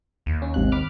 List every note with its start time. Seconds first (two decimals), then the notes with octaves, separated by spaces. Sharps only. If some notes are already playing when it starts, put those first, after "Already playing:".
0.26 D#2
0.42 C#4
0.54 G#1 C3 F#6
0.72 B5 D6 F6